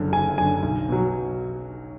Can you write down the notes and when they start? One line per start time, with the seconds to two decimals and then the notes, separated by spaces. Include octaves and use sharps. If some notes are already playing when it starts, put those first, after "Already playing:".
Already playing: F#1 F#2 D3
0.12 F#1 G#5
0.38 F#2 D3 G#5
0.63 B1
0.89 B2 F#3